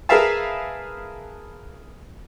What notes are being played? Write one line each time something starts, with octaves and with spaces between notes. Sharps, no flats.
G#4 A#4 B4 E5 F5 A5